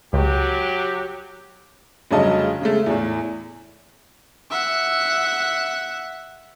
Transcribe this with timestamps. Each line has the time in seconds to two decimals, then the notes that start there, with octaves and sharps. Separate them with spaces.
0.13 C#2 F#3 G4
2.11 F1 G2 C#3 F#3 D#5 A5
2.62 C#3 G#3 A3
2.86 E2 A2
4.51 E5 F#5